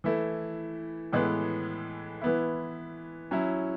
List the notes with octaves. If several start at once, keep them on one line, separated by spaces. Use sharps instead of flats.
E3 A3 E4
A2 E3 G#3 B3
E3 B3 E4
F#3 C#4 E4